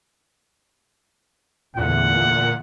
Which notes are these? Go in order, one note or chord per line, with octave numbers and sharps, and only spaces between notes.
E2 A#2 D3 A3 F#5